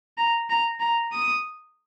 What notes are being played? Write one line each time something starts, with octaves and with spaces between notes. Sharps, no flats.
A#5
A#5
A#5
D#6